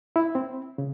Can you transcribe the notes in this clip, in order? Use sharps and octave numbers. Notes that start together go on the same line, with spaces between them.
E4
C4
C#3